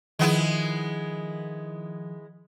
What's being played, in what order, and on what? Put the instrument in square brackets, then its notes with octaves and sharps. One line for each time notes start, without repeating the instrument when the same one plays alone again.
[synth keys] D#3 F3 [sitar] G#3 B3 E4